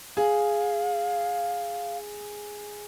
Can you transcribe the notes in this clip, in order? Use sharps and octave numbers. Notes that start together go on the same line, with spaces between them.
G#4 F5